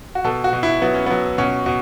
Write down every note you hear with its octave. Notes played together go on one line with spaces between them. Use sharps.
F#4
B2 A4
F#4
B2
E4
F#3 B3
C#4
F#3 B3
B2 C#4
B2